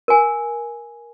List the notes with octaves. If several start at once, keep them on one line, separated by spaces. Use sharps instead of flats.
A#4 G#5